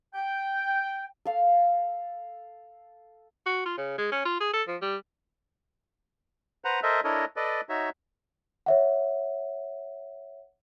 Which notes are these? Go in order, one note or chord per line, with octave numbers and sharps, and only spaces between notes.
G5
A4 F5
F#4
F4
C#3
G#3
C#4
F4
G#4
A4
F3
G3
B4 C5 F#5 A#5
A4 A#4 C5 D#5 E5
D4 E4 A4 A#4 C#5 D#5
A4 B4 D5 D#5
D#4 F#4 C#5 E5
C#5 E5 F#5